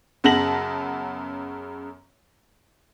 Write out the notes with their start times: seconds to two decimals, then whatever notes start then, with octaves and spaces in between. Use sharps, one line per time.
0.24 F#2 C#3 B3 A5 A#6 F#7